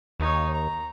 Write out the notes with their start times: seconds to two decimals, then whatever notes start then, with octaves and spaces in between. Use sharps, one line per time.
0.20 D#2 D#4 C#5
0.54 A#5